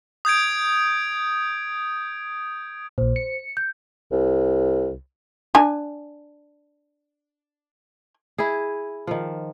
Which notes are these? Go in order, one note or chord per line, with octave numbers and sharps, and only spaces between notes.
D#6 G6 G#6 D7
A#1 A#2 C5
C#7
G6
C2
D4 G#5
E4 G#4
D#3 F3